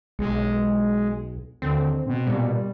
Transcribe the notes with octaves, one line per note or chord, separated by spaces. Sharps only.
B1 G#3
D#2 D3 C4
B2 C4
A#2 G3